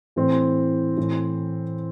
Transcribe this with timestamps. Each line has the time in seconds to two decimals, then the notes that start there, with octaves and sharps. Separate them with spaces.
0.16 A2 E3 C4
0.97 A2 E3